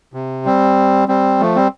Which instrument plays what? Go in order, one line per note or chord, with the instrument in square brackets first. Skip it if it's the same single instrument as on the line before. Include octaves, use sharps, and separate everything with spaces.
[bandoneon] C3
G3 C4
G3 C4
F3 A3
G3 C4